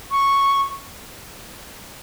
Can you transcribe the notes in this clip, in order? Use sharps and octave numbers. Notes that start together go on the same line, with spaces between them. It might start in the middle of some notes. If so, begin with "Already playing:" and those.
C#6